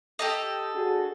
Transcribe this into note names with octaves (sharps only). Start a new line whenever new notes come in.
G4 A4 D#5
D4 F#4 G#4